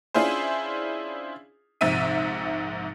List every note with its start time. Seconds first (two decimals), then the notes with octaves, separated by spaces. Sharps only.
0.14 C#4 D4 E4 F4 G#4 C5
1.81 A#1 G#2 C3 E5 D#7